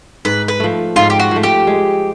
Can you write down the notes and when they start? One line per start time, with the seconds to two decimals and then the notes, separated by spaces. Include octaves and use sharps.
0.25 G#2 B4
0.48 B4
0.60 F3 A3
0.96 G#2 F4
1.10 G4
1.20 F#4
1.31 F3 A3
1.43 G4
1.67 G#3